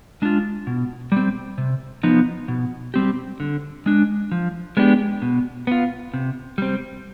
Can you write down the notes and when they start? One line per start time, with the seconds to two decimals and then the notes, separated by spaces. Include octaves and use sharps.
0.22 G#3 D4 F4
0.67 B2
1.12 G3 C4
1.58 C3
2.03 F3 B3 D#4
2.48 B2
2.94 G3 C4 G4
3.40 D3
3.86 G#3 D4
4.32 F3
4.77 G#3 B3 D4 G4
5.22 B2
5.67 B3 F4
6.14 C3
6.58 G3 C4